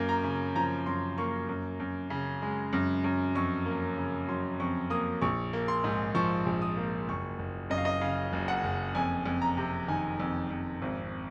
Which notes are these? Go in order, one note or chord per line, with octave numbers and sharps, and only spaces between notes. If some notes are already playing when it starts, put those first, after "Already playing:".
Already playing: F#2 A#3
A#5
C#3
F3 A#5
F#2 C6
A#3 C#6
F#2
F#2
C#3
G#3
F#2
F#2
F2 C#6
A#3
C#3
F#3 C6
F2 C#6
A#3 D#6
A#1 C#6
A#3
C6
G#2
F3 C#6
A#1
D#6
A#3
F#1 C#6
F#1
F#2 D#5
F5
D#5
C#3 F5
F#1
F#5
F#1
F2 G#5
F2
A#5
C3
D#3 G#5
F2
F2
G#1